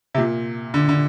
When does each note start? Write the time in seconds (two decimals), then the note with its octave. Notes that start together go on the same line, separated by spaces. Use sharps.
0.14 C3
0.18 A#2
0.74 D3
0.89 D3